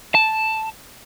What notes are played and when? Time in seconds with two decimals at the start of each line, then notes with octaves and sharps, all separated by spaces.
0.15 A5